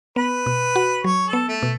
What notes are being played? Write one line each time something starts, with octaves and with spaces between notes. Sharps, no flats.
B3 B4
B2
F#4
F#3 C#5
A4
B3
A3
B2